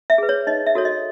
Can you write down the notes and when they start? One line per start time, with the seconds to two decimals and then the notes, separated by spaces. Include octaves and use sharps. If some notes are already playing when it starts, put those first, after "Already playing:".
0.10 E5
0.18 G#4 B4
0.29 C#5
0.47 D#4 D#5
0.67 E5
0.75 F#4 A4 C#5
0.85 D#5